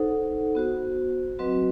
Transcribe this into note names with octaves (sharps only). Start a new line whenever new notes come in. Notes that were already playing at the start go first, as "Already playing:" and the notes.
Already playing: D#4 A4 C5 F#5
B3 F#4 C5
F#3 C4 F#4 B4 D#5